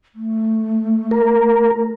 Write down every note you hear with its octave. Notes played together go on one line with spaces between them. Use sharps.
A3
A#4